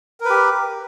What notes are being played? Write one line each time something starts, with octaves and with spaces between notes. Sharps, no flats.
G4 A#4 B4